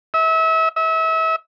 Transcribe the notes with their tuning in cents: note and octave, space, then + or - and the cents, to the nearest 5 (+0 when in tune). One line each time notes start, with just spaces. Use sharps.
E5 -30
E5 -30